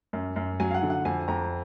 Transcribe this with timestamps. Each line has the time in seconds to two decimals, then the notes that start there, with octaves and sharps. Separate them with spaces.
0.13 F#2
0.36 F#2
0.60 F#3 G#5
0.71 F5
0.74 F#5
0.83 D3
0.90 F#5
1.05 F2 G#5
1.28 F2 A#5